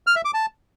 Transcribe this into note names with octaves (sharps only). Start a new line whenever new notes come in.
F6
E5
D6
A5